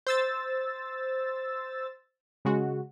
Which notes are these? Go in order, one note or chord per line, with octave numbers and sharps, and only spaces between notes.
C5 E6 A6
C#3 G#3 F#4